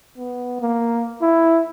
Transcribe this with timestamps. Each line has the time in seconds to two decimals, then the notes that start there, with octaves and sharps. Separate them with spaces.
0.18 B3
0.60 A#3
1.22 E4